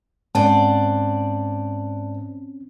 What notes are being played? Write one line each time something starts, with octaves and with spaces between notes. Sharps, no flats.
G#2 C4 C#4 C5 D5 F#5 A5